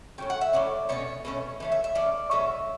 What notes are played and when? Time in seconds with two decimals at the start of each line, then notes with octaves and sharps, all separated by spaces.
0.18 A2 F#3 C#4 G5
0.30 F#5
0.41 E5
0.53 A2 F#3 C#4 D5
0.89 B2 A3 C#4 C#5
1.25 B2 A3 C#4
1.60 E3 A3 C#4
1.72 E5
1.84 E5
1.95 E3 A3 C#4 D5
2.31 B2 F#3 A3 C#4 E5